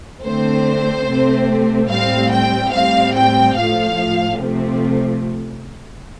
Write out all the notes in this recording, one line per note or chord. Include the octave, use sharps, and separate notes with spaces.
D3 A3 C4 C5
C3 A3 C4
A2 G3 C4 F5
G5
A2 G3 C4 F5
G5
A2 F3 A3 F5
C3 F3 A3 C4